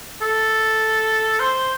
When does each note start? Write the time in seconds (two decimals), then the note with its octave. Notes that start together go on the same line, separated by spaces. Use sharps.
0.22 A4
1.40 C5